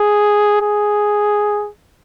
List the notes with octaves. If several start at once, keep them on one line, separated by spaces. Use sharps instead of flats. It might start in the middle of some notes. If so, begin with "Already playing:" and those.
Already playing: G#4
G#4